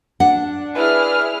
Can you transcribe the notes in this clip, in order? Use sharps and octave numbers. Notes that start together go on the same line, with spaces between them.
D4 F#5
E4 G#4 B4 F6